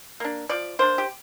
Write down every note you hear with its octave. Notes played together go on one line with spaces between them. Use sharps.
A#3 D4
F3 D5
A#3 D4 C5
G4